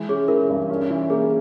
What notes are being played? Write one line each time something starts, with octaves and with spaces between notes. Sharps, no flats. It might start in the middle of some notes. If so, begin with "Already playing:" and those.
Already playing: E3 G#3
C#4 G#4
E3 A#4
G2
C#4
E3
A#3 G#4